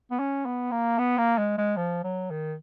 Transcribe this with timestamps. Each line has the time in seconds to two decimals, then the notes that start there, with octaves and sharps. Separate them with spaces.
0.11 B3
0.19 C#4
0.46 B3
0.71 A#3
0.98 B3
1.18 A#3
1.38 G#3
1.58 G#3
1.76 F3
2.04 F#3
2.30 D#3